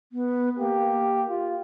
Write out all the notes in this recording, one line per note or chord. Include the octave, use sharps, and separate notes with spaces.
B3
A#3 G4
F4